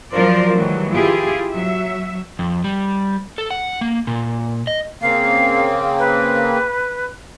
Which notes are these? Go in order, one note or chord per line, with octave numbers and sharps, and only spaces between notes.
F3 F#3 F4 A#4 C5 D5
D#3 E3 F#3 G3 A3
E4 F4 G4 G#4
F#3 E5
F2
G3
A4
F#5
A#3
A#2
D#5
C#3 A#3 C4 F5
B4